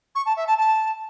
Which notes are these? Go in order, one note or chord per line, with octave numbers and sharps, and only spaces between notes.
C#6
A5
E5
A5
A5